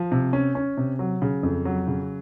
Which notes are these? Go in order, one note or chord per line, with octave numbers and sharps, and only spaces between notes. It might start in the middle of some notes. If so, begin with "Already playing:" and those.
Already playing: F3
C3
C#4
C#4
C3
F#3
C#3
F2
F#3
C#3